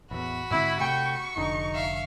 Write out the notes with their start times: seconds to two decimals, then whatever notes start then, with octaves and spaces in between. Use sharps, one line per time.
0.11 A1 E2 F#4 B5
0.51 G#2 D3 C4 E4
0.80 C3 A3 G5 C#6
1.37 F1 D3 D4 D#4
1.74 E5 F5